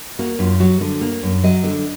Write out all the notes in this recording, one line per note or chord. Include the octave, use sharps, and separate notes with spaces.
A#3 F#4
F#2 F4
F#3 F#4
D3
A#3
F#2
F#3 D#5
D3